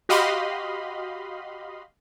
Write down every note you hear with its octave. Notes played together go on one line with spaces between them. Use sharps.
F#4 G4 D#5 F5 B5 C6